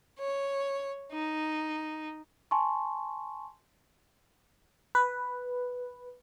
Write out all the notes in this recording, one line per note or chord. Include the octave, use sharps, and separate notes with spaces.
C#5
D#4
G#5 A5 C6 C#6
B4